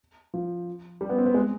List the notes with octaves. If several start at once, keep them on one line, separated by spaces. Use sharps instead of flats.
F3
G3
B3
C4
B3
G#3